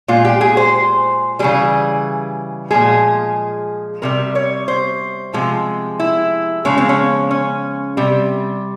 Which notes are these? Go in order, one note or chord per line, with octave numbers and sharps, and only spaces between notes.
A#2 G#3 F4
G4
G#4
C5
C#3 E3 G3 G#4
A#2 F3 G#3 G#4
C3 G3 A#4
C#5
C5
C3 F3 G#3
E4
C#3 F3 G#3 C#4
C4
C#4
C#4
C3 G3